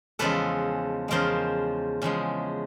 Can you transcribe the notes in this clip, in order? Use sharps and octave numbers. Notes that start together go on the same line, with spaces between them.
E2 C#3 F3 G#3 A4 B4
E2 C#3 F3 G#3 A#4 C5
E2 C#3 F3 G#3